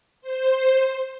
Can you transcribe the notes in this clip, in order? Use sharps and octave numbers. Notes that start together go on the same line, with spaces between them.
C5